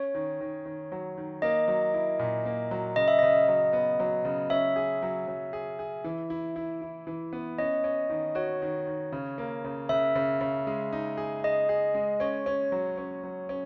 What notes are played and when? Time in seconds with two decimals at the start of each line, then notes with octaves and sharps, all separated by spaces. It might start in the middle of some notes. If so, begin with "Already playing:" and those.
Already playing: C#4 C#5
0.15 D#3
0.41 D#3
0.66 D#3
0.92 F#3
1.18 D#3
1.42 A#3 D#5
1.68 F#3
1.94 E4
2.19 A#2
2.45 A#3
2.71 F#3
2.96 C#3 D#5
3.08 E5
3.19 C#3 D#5
3.48 F#3
3.73 B3
4.00 F#3
4.25 C#3
4.50 C#4 E5
4.76 G#4
5.03 F#3
5.28 F#3
5.53 G#4
5.79 G#4
6.04 E3
6.30 E4
6.56 E4
6.82 E4
7.07 E3
7.33 B3
7.58 C#4 D#5
7.84 C#4
8.10 D#3
8.35 F#4 C#5
8.62 D#3
8.87 D#3
9.12 C#3
9.38 A#3
9.64 C#3
9.89 C#3 E5
10.15 C#3
10.41 C#3
10.67 G#3
10.93 D#4
11.17 G#4
11.44 G#4 D#5
11.69 G#4
11.95 G#3
12.20 C#4 C#5
12.46 C#4
12.72 F#3
12.98 C#4
13.24 F#3
13.49 C#4